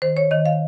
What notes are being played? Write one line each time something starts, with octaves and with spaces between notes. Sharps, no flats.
D#3 C5
C#5
D#3 D#5
F5